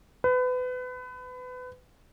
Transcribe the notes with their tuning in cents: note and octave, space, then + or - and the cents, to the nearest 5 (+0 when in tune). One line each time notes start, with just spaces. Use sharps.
B4 +30